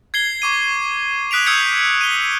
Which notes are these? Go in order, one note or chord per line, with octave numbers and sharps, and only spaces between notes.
G#6 C7 G7
C#6 D6 D#7
D#6 F#6 B6 D7 F7
D#6 E6 G6 G#6 C#7 F7
D#7 G7